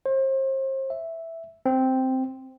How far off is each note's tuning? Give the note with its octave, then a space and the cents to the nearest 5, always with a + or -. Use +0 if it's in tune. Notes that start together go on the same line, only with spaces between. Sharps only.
C5 +35
E5 +0
C4 -5